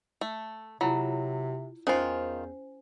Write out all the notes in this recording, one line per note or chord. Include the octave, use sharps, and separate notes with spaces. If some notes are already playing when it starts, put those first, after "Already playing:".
A3
C3 F#3 E4 F4
E2 D#3 C#4 F4 C5 G#5